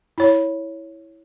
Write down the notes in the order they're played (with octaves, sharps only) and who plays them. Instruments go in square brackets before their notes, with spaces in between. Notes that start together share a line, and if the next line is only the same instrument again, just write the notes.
[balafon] E4 C#5